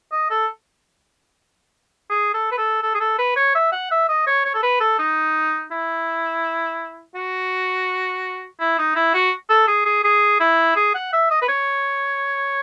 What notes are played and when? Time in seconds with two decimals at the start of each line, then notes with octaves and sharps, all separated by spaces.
0.12 D#5
0.30 A4
2.10 G#4
2.34 A4
2.51 B4
2.58 A4
2.82 A4
2.95 G#4
3.00 A4
3.18 B4
3.36 C#5
3.55 E5
3.72 F#5
3.91 E5
4.09 D#5
4.27 C#5
4.45 C#5
4.54 A4
4.63 B4
4.80 A4
4.99 D#4
5.72 E4
7.15 F#4
8.60 E4
8.78 D#4
8.96 E4
9.14 F#4
9.49 A4
9.68 G#4
9.86 G#4
10.04 G#4
10.40 E4
10.76 G#4
10.94 F#5
11.13 E5
11.31 D#5
11.42 B4
11.48 C#5